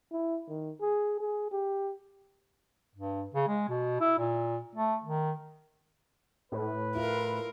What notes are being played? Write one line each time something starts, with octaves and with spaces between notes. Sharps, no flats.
E4
D#3
G#4
G#4
G4
G2
C#3
G#3
B2
E4
A#2
A3
D#3
A2 B4
E4 F4 A#4 F5